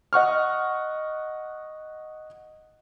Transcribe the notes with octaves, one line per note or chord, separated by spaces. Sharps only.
D#5 F#5 C#6 F6